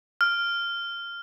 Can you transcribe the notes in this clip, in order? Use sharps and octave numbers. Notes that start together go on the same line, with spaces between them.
F6